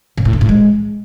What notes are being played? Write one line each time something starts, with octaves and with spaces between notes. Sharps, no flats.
A#2
A2
D3
A2
G#3